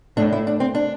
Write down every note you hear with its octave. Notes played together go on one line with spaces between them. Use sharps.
A2 D4
E4
D4
C4
D4